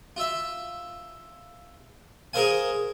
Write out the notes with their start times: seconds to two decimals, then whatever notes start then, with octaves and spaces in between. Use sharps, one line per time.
0.17 F4 E5
2.33 G#4 A#4 C5 F5 G#5